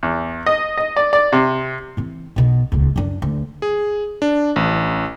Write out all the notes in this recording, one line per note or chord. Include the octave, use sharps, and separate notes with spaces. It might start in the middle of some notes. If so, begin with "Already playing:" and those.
E2
D#5
D#5
D5
D5
C3
E3 C4
B1 B2
D#1 C#2
F#2 D4
D2
G#4
D4
A1